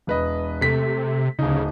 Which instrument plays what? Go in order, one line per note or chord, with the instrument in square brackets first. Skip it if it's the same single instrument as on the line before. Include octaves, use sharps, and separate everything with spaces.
[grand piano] E1 B4 D#5
[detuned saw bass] C3 [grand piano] A3 B6
[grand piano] D1 D#4 [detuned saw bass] C#3